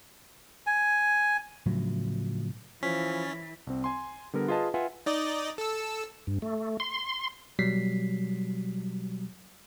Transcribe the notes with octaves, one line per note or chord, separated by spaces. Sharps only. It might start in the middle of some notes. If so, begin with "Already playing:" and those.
G#5
A2 C#3 F3 F#3
E3 F3 C#4 B6
C2 C4
G#5 C6
D3 G3 B3 A#4
F4 G#4 B4 D#5 A5
F4 B4 E5 F#5 G#5
D#4 D5 D#5
A4 E6
G2
A3
C6
B2 F#3 G3 B6 C7